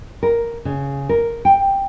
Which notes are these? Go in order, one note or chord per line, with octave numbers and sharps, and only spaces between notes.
A#4
C#3
A#4
G5